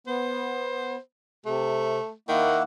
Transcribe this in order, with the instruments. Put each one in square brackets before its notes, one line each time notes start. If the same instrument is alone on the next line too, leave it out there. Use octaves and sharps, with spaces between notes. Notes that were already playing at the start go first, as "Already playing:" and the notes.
[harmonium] B3 [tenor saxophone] C5
[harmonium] C3 [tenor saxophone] A3
[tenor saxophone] D#3 [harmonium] A#3 E4 F#5